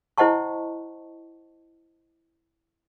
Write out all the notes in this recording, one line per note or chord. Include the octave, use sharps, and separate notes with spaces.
E4 C5 D#5 F#5 A5 C#6